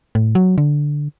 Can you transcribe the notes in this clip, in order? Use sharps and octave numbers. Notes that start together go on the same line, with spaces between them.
A2
F#3
D3